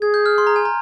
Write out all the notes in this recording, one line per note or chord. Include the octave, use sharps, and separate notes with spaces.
G#4 G#6
G6
F6
C6
A#5
G#5
A#5